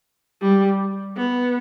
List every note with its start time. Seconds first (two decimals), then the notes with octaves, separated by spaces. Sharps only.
0.42 G3
1.17 B3